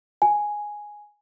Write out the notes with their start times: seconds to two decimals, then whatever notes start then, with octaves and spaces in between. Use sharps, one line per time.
0.22 G#5